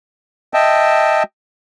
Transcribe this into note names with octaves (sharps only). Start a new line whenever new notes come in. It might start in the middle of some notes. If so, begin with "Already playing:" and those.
D#5 E5 G5 A5